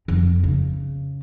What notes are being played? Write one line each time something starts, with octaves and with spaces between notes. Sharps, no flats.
F2
C#3